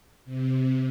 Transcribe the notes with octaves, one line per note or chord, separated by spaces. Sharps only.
C3